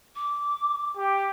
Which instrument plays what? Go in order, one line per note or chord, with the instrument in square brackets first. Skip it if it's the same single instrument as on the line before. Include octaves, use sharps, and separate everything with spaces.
[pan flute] D6
[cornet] G4